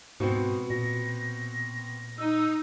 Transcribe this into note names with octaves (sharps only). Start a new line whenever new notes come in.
G#2 B2 B3 C4 F#4
A#2 A#6
D#4 E6